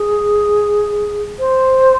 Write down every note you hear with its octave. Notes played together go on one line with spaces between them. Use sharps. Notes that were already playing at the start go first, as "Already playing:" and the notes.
Already playing: G#4
C5